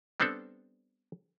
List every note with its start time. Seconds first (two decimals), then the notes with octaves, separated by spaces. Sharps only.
0.20 G3 B3 C4 D4 A4